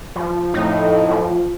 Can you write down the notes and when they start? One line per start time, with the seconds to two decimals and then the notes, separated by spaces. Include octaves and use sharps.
0.16 F3
0.54 F2 A2 D#4
1.11 F3